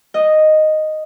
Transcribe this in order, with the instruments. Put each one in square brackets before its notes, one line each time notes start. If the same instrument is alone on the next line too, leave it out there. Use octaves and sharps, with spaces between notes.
[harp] D#5